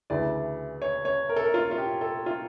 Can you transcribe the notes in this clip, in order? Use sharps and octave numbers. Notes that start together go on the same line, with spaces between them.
D2 C#3 E3 A3 D5
C#5
C#5
A#4
A4
A#4
F4
F4
G4
A4
F4